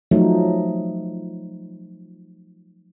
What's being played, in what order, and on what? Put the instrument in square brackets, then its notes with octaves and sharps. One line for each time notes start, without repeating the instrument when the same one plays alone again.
[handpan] F3 F#3 A3 D#4